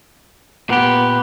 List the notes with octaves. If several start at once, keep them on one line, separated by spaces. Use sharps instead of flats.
A#2 B3 G4